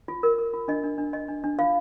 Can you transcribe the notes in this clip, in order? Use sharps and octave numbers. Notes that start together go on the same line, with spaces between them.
F4
A#4
A#4
F4
D4 D#5
D4
D4
D4 D#5
D4
D4
F4 F5